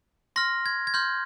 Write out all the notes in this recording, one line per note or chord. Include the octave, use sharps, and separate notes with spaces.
C6 F6 A#6
G#6
G#6
C6 F6 G6